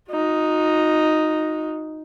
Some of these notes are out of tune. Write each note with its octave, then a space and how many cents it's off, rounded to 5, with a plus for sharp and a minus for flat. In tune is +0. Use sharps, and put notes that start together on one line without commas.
D#4 +0 F#4 -40